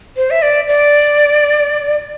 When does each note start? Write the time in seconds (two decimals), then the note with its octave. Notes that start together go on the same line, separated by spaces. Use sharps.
0.17 C5
0.31 E5
0.42 D5
0.68 D5